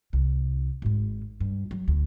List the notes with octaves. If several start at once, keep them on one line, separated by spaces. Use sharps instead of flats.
C2
G#1 G#2
G2
F#3
D2